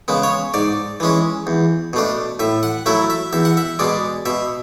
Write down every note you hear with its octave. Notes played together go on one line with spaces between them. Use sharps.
C#3 G#3 B3
C#5
G#2 D5
E3 G#3 C#4
E2
B2 A3 D4
A2 E5
F#5
F#3 A3 E4 E5
E5
E2 E5
F#5
E5
B2 G#3 D5
B2 E5